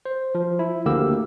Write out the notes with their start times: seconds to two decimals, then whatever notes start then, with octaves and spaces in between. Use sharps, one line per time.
0.05 C5
0.35 F3
0.59 E4
0.85 D2 D3 A#3 G4 E6